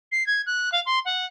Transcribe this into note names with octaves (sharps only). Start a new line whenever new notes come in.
C7
G#6
F#6
F5
C6
F#5